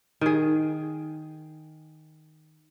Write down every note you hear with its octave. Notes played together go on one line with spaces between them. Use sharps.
D#3 G#4